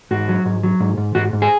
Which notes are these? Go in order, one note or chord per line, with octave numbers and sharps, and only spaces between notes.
G#2 F#4
F#3
G#2
F#3
G#2
G#2
G#2 F#4
G#2
G#4